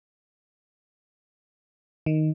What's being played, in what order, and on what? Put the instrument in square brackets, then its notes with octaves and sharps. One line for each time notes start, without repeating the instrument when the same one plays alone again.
[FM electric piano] D#3